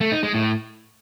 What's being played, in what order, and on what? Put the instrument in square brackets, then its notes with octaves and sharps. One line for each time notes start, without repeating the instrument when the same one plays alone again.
[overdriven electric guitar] A3
D#4
G#3
A2